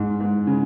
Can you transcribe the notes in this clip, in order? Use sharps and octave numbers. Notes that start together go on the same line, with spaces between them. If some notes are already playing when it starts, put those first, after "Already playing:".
Already playing: G#2
G#2
C#3